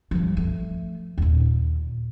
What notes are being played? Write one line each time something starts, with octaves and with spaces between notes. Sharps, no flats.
G2 F3
F3 A3
D#2 A#2